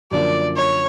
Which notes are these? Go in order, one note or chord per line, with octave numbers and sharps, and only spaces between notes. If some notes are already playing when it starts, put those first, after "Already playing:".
F#2 D3 F3 A#3 D5
C#5